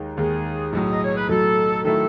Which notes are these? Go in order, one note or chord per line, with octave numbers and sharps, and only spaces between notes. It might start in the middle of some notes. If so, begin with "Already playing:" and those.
Already playing: D#2 D#3 G#3
D#2 D#3 G#3 G#4
B1 A2 F#3 G#4
D#5
C#5
B4
B1 A2 F#3 A4
D#3 F#3 A3 E4 A4